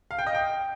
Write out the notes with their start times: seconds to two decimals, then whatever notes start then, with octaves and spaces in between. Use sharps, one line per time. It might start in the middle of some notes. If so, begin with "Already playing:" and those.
0.11 F5
0.19 G5
0.27 D#5
0.35 G5